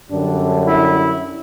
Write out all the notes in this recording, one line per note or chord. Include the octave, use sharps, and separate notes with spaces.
F#2 D3 G3 D4
E4